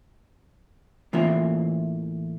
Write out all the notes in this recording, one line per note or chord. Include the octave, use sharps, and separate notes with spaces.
A2 E3 A#3 C4 F4 E5